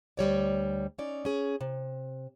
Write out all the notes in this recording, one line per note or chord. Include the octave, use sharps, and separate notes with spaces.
D2 G3 C#5 D5
C#4 D#4 D5
C#4 G#4
C3